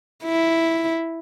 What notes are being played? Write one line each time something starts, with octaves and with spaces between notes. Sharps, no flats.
E4